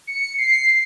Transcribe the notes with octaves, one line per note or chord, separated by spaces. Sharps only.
C#7
C7